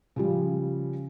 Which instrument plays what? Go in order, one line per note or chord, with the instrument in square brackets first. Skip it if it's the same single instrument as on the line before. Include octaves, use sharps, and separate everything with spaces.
[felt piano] C#3 F3 G3